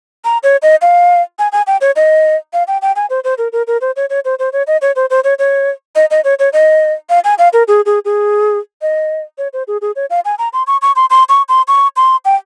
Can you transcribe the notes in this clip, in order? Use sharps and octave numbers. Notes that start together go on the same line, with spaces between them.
A#5
C#5
D#5
F5
G#5
G#5
G5
C#5
D#5
F5
G5
G5
G#5
C5
C5
A#4
A#4
A#4
C5
C#5
C#5
C5
C5
C#5
D#5
C#5
C5
C5
C#5
C#5
D#5
D#5
C#5
C#5
D#5
F5
G#5
F5
A#4
G#4
G#4
G#4
D#5
C#5
C5
G#4
G#4
C#5
F5
G#5
A#5
C6
C#6
C#6
C6
C6
C#6
C6
C#6
C6
G5